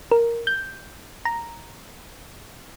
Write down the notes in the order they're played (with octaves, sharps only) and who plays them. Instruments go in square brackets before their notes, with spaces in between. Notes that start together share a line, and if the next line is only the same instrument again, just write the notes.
[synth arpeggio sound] A#4
G6
A#5